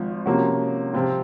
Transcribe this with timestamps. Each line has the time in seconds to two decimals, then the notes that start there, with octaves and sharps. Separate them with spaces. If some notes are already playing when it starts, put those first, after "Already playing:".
Already playing: G#1 G#2 F3
0.26 C3 F3 A#3 C#4 F#4
0.94 C3 F3 C4 F4